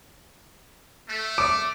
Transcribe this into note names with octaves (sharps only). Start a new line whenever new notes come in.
A3
D6